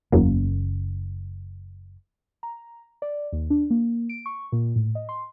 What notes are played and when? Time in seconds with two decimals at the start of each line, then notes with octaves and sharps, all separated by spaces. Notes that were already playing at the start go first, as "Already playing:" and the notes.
0.12 F#1 E2 F#3 A#3 C#4
2.43 A#5
3.02 D5
3.33 D#2
3.50 D4
3.70 A#3
4.09 D7
4.26 C#6
4.52 A#2
4.76 A2
4.95 D#5
5.09 C6